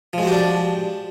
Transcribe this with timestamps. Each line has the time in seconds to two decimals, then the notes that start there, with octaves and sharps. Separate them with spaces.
0.13 F3
0.18 G#3
0.23 F#4
0.27 G4
0.32 D4